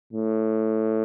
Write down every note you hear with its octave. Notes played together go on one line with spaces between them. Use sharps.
A2